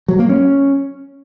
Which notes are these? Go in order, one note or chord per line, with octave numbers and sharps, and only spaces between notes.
F#3
A#3
C#4